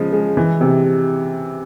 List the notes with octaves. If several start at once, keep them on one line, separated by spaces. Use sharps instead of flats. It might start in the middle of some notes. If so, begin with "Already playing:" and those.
Already playing: C#3 F3 G#3
G#3
E3
C3